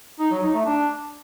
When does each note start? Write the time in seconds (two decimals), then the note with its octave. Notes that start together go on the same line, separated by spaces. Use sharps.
0.19 D#4
0.31 F#3
0.42 D#4
0.54 A3
0.66 D4